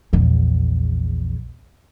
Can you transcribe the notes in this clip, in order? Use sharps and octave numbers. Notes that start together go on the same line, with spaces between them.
A#1 E2